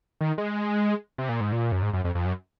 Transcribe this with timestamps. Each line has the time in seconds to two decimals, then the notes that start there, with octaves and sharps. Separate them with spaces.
0.21 D#3
0.38 G#3
1.18 C3
1.29 A#2
1.41 G#2
1.52 A#2
1.72 F#2
1.82 G#2
1.93 F#2
2.04 F2
2.15 F2
2.25 F#2